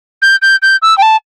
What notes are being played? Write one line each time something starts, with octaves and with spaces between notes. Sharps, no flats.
G6
G6
G6
E6
G5
A5